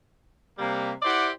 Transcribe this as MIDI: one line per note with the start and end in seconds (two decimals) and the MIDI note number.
0.58 0.92 48
0.58 0.92 55
0.58 0.92 58
1.02 1.30 64
1.02 1.30 67
1.02 1.30 72
1.02 1.30 74
1.02 1.30 76
1.02 1.30 78